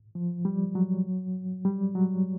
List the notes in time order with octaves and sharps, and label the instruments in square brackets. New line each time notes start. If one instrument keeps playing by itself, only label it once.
[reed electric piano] F3
G3
F#3
G3
F#3